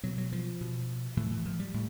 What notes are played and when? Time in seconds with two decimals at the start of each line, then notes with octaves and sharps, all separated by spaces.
0.03 B2 F#3
0.18 F#3
0.32 F3
0.61 B2
1.17 A2 E3
1.31 E3
1.45 F3
1.59 G3
1.74 A2